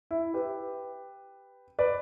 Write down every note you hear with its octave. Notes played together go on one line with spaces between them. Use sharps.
E4
G4 B4
B4 D5